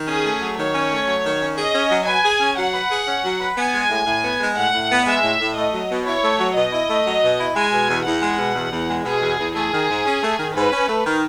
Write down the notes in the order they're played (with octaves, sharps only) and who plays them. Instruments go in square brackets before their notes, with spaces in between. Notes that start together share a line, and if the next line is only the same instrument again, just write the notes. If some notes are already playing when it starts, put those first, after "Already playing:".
Already playing: [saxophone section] D#3
[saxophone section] C#4 [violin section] G#4
[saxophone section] A3
F#3
[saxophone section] D#3 [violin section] C#5
[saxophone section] C#4
A3
F#3
D#3
C#4
[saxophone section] G#4 [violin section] D#5
[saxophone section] C#4
F#3
[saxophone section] B4 [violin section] G#5
[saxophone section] G#4
C#4
[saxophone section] F#3 [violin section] F#5
[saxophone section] B4
G#4
C#4
F#3
B4
[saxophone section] B3 [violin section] G#5
[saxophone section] G#3
A2
A2
B3
G#3
[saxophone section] A2 [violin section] F#5
[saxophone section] A2
B3
[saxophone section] G#3 [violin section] E5
[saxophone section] A2
A2
[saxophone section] A3 [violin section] D#5
[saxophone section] F#3
B2
[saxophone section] E4 [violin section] C#5
[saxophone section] A3
F#3
[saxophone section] B2 [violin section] D#5
[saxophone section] E4
A3
F#3
B2
E4
[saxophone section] G#3 [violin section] G#5
[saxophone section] B2
E2
[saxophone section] E2 [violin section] F#5
[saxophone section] G#3
B2
E2
E2
G#3
[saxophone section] B2 [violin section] G#4
[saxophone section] E2
E2
[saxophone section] A3 [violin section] G#4
[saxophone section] D#3
G#2
C#4
A3
D#3
[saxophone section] G#2 [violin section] B4
[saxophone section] C#4
A3
D#3